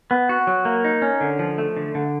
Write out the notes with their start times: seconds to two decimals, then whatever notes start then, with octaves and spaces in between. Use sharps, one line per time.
0.11 B3
0.29 F#4
0.47 F#3
0.65 A#3
0.84 D#4
1.02 C#4
1.21 D3
1.39 F3
1.58 A3
1.77 D3
1.95 D3